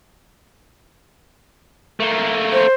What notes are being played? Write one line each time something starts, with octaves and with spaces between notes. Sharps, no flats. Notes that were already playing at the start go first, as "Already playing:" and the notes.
A3 A#3
C5